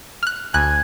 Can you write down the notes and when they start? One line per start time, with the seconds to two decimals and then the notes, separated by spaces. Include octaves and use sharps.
0.23 F6 F#6
0.54 D2 G#5 F#6